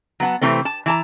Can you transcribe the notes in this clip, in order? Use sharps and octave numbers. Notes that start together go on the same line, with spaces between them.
F#3 B3 F#5 A5
C3 E3 A3 C4
A5
E3 A5 A#5